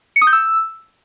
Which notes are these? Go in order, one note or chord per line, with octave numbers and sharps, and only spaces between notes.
C#7
D#6
G6
E6